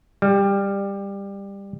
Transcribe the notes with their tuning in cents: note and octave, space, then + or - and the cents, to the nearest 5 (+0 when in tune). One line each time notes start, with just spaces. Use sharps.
G3 +20